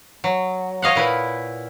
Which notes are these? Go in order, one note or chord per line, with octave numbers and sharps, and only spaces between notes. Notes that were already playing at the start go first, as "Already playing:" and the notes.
F#3
C#5 D#5 F5 F#5
A#2 E4 B4